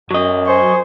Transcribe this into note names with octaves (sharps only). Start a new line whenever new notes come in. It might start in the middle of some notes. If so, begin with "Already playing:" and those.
F#2 F#3 D#5
C5 G#5 C#6